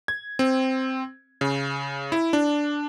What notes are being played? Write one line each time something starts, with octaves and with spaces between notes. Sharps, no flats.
G#6
C4
C#3
E4
D4